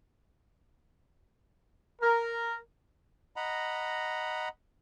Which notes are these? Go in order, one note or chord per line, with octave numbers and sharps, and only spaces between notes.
A#4
D#5 F#5 A#5 B5